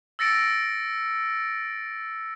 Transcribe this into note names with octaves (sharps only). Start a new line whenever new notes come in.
E6 A6 A#6 C#7 D7